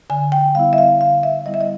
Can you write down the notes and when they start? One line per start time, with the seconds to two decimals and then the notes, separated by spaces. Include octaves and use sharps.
0.10 D3 G#5
0.32 G5
0.55 G3 B3 E4 F5
0.73 E5
0.78 F5
1.00 D3 F5
1.23 E5
1.46 G3 B3 E4 D#5
1.54 E5
1.61 D#5